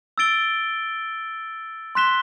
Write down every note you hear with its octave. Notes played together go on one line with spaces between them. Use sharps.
E6 A6 D7 G7
C6 F#6 B6 E7 G7